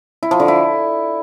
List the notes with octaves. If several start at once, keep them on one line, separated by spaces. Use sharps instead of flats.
E4
F3
D3
E4